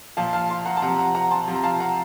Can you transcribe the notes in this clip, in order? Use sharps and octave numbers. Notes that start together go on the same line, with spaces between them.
A#2 F3 F5 A5
F5 A5
A5 C6
F#5 A#5
A5
C3 F3 F#5 A#5
F#5 A#5
F#5 A#5
A5 C6
C3 F3
A#5
F5 A5
F#5 A#5